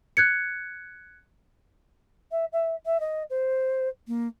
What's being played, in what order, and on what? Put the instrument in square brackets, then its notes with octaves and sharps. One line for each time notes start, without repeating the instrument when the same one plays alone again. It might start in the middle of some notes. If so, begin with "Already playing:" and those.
[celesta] F#6 G#6 C#7
[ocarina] E5
E5
E5
D#5
C5
A#3